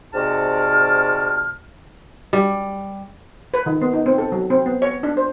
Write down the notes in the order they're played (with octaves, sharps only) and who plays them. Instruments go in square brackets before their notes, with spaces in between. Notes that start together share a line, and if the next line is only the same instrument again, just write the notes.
[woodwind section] G#2 C3 F#4 D5 A5 F6
[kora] G3
[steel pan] B4
D#3
B3
D#4
C4
A4
F#3
C4
B3
C#5
D4
C5